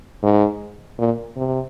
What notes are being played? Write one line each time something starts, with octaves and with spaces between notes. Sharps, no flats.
G#2
A#2
C3